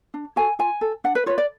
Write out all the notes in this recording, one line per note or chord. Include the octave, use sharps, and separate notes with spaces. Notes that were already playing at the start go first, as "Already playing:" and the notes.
D4
F#4 A4 G#5
F4 G#5
A4
D4 F#5
B4
F4 B4 C#5
D5